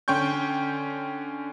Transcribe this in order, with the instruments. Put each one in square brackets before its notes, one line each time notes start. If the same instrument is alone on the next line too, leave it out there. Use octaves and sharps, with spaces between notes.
[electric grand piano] D3 C#4 G5 C6 C#6 G6